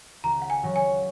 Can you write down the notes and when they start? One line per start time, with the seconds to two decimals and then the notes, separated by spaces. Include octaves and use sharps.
0.24 C#2 A#5
0.42 F#5
0.50 G#5
0.63 C#3 F#3 C#4
0.76 G#5